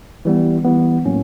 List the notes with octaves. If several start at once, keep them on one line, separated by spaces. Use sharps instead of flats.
E3 G3 B3
E3 G3 B3
A2 F#3 A#3 C#4